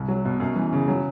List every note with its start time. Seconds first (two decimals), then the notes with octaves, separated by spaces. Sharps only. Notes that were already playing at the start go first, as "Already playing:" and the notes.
Already playing: C2
0.09 F#3
0.25 B2
0.40 F#2
0.56 E3
0.73 C#3
0.88 F#3